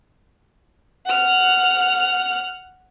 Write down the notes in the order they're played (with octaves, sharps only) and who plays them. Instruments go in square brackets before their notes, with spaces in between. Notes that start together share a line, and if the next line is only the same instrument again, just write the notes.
[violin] F#5 F6